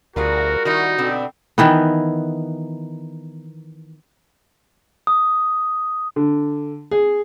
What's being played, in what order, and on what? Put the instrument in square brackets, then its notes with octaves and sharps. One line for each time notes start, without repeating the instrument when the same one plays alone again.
[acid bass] D2 [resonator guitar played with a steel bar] G3 F4 G#4 [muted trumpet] F#4 [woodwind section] A#4
[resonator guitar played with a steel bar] D#3 G3 E4 [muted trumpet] D#4 [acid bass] F#4
[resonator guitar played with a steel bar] B2 B3 D4 [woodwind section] D3 C4
[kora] D#3 E3 B3
[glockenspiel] D#6
[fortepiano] D3
G#4